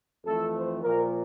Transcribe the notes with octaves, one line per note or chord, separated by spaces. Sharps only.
F2 E3 A3 A4
C5
A#2 F3 A#3 A#4